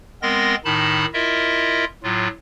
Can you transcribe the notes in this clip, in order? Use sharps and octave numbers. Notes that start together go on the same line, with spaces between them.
G#3 B3 C4 A#4 C6 A#6
A2 D#3 D#4 A5 B5
E4 F4 A#4 D#5 E5
A2 F#3 F4